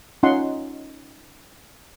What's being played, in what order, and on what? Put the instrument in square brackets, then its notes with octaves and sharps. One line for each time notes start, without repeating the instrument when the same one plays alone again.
[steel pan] C#4 D#4 F4 D#5 F#5 C6